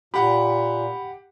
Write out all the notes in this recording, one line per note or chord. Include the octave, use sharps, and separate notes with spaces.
A#2 G4 F#5 G5 B5